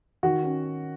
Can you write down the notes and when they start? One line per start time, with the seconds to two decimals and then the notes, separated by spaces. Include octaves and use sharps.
0.23 D#3 F#4
0.43 C#4